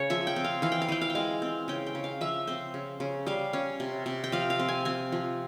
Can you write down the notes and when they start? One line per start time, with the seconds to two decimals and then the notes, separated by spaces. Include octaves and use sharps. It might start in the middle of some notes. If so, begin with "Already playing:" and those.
Already playing: C#3 C#5
0.10 F3 E5
0.27 G5
0.36 C4
0.44 F5
0.62 E3 F5
0.72 G5
0.82 F5
0.89 E3 G5
1.01 F5
1.10 G5
1.15 G#3 F5
1.42 C4
1.68 C#3 G5
1.86 G5
1.95 C#3
2.04 F5
2.21 F3 E5
2.47 C4 C5
2.74 C#3
3.00 C#3
3.27 G3 F5
3.53 C#4
3.80 C3
4.06 C3
4.24 G5
4.32 F3 F5
4.50 F5
4.59 C4
4.68 G#5
4.85 C4 G#5
5.12 F3